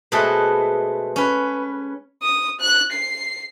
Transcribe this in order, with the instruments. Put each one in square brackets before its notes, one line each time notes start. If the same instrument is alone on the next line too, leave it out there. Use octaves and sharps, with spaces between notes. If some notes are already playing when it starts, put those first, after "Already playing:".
[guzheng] B2 G#3 A3 C4 A4 B4
C#4 B4
[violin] D#6
F#6
C7